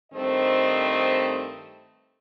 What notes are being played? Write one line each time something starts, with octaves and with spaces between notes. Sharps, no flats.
G2 D#3 A3 C4 C5 D#5